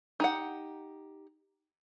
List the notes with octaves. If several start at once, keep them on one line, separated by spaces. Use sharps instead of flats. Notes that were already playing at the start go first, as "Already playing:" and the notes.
D#4 G4 F#5